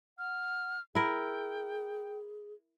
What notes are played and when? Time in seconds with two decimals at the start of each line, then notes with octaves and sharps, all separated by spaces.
0.18 F#5 F6
0.95 E4 G#4 A#4 G5